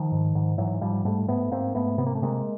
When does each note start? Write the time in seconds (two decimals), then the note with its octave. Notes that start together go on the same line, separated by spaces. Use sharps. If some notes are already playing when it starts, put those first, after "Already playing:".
Already playing: D#3 F3
0.12 G#2
0.35 G#2
0.58 G#2 E3 F#3
0.81 G#2 F3 G3
1.05 G#2 G3 A3
1.28 G#2 A3 B3
1.51 G#2 A#3 C4
1.75 G#2 A3 B3
1.98 C3 B3
2.06 A#3
2.15 A3
2.22 C3 G#3 A#3